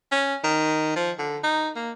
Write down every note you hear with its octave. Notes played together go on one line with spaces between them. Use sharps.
C#4
D#3
F3
D3
D#4
A#3